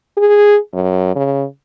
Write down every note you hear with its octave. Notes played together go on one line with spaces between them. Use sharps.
G#4
F#2
C#3